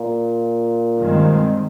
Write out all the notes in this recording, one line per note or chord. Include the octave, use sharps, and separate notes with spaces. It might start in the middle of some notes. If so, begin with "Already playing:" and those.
Already playing: A#2
G2 D#3 G#3 C4